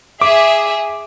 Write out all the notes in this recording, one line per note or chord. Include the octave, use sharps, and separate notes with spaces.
G#4 E5 D6